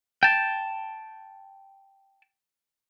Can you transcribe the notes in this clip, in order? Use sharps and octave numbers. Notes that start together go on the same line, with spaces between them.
G5 A5